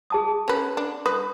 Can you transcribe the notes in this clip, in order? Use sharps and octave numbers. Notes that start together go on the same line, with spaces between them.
G#4 A5 D#6
C#4 B4
D4
B4 D#6